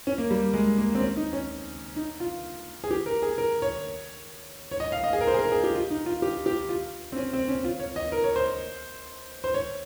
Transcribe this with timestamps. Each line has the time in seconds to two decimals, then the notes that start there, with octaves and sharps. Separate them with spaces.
0.07 C#4
0.18 A#3
0.31 G3
0.54 G#3
0.78 A#3
0.95 C4
1.01 C#4
1.17 D#4
1.33 C#4
1.96 D#4
2.20 F4
2.84 G#4
2.91 G4
3.06 A#4
3.22 G#4
3.38 A#4
3.62 C#5
4.71 C#5
4.80 D#5
4.92 F5
5.04 D#5
5.13 G#4
5.21 A#4
5.27 C5
5.34 G#4
5.39 A#4
5.52 G#4
5.64 G4
5.75 F4
5.91 D#4
6.06 F4
6.22 G4
6.46 G4
6.69 F4
7.12 C4
7.16 C#4
7.33 C4
7.48 C#4
7.64 F4
7.80 C#5
7.96 D#5
8.12 A#4
8.24 C#5
8.36 C5
9.44 C5
9.54 C#5